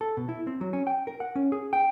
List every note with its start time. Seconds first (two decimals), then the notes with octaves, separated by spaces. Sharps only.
0.01 A4
0.17 B2
0.29 E4
0.47 C4
0.61 F#3
0.73 C#4
0.87 G5
1.07 A#4
1.20 F#5
1.36 C#4
1.52 G#4
1.73 G5